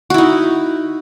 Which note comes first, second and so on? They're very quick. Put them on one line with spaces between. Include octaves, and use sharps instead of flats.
F#4 E4 D#4